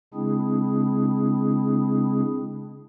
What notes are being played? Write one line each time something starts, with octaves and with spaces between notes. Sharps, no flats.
C#3 G#3 C4 D4 E4 G#4